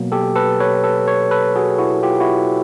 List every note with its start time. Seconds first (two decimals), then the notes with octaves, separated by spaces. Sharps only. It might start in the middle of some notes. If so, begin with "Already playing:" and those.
Already playing: B2 F#3 A#3
0.12 G4 A4
0.36 A4 B4
0.60 B4 C#5
0.84 A4 B4
1.07 B4 C#5
1.31 A4 B4
1.55 F#4 G#4
1.78 E4 F#4
2.03 F4 G4
2.20 E4 F#4